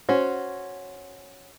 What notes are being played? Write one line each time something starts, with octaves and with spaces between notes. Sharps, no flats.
C#4 F#4 C5